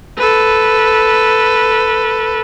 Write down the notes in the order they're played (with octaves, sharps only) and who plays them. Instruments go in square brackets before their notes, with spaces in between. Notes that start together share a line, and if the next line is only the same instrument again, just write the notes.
[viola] A4 B4